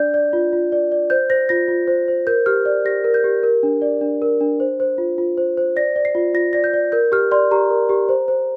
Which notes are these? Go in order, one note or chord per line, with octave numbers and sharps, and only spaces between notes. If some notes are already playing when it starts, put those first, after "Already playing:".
Already playing: D4 D5 G6
D5
F4
F4
D5
D5
C5 G6
C5 A#6
F4 A#6
F4
C5
C5
A#4 G6
G4 F6
D5
G4 A#6
A#4
G6
G4
A#4
D4
D5
D4
A#4
D4
C5
C5
F4
F4
C5
C5
D5 A#6
D5
C7
F4
F4 A#6
D5 A#6
G6
D5
A#4 G6
G4 F6
D5 C6
G4 A#5
A#4
G4
C5
C5